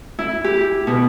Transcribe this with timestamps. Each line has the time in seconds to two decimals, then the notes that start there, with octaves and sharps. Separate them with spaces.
0.19 E4
0.44 G4
0.87 B2